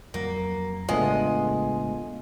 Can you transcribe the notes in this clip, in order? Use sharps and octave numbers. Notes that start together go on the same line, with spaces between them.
F2 F#3 A#3
A1 C#3 G#3 A3 B3 D4 F4 D#5